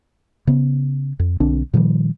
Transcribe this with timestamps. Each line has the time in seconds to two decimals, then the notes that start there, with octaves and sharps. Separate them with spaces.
0.47 C#3 B3
1.20 F2
1.40 B1 D3 C4 D4
1.74 A#2 D#3 F3 G3